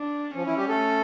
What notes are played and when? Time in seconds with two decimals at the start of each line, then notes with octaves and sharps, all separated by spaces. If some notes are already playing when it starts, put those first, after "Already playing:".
Already playing: D4
0.35 F3 C#4
0.46 E3 E4
0.57 G3 G4
0.69 A3 A4